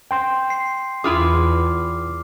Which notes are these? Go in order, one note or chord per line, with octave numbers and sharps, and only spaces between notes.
G5 C6 G6
C7
E2 E4 F4 G#4 D6 F6